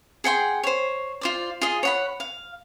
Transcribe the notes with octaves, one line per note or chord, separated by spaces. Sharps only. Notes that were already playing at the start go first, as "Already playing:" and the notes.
G#4 F#5 G5 C6
C5 C#5
F4 C5 D5
F4 G#4 D#5
C#5 F#5 B5
F5